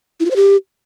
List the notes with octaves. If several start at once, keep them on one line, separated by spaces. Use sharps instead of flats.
E4
F4
C5
G4